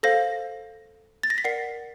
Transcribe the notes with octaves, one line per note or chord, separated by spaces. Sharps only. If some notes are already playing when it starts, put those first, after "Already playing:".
A4 C5 F5 A#6
A6
A#6
B6
A#4 D5 F#5 C7